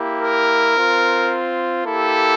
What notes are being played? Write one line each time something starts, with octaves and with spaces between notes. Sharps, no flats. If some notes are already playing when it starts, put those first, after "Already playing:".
Already playing: A#3 E4 G4
A#4
C4 F4
A#3 E4 G4 A4